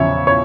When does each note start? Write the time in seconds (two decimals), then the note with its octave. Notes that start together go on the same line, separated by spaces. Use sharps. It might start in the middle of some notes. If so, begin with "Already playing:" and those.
Already playing: E2 C#3 F3 C#5 E5
0.27 C#5